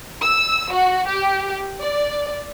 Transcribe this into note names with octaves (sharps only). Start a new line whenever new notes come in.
E6
F#4
G4
D5